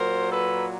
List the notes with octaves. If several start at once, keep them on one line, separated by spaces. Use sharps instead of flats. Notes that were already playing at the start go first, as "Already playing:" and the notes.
Already playing: A#2 F#3 A#4 C5
A4 B4